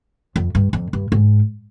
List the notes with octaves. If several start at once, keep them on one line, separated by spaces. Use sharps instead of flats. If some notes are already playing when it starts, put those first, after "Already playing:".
F2
G2
F2
G2
G#2